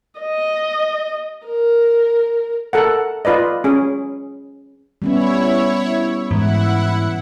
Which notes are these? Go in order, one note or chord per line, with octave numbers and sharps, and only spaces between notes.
D#5
A#4
A4 A#4 F#5
F4 B4 D5 D#5
C#4 G#4
G3 B3 C#4 E4 C#5
G#2 E3 E4 F#5